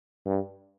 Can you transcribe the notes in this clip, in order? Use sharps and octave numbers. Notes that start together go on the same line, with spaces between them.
G2